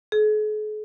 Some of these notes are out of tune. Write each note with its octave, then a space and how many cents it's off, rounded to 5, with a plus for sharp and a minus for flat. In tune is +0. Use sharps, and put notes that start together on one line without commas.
G#4 +45